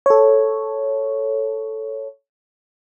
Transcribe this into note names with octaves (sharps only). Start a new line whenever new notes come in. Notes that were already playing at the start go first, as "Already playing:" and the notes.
A4 C#5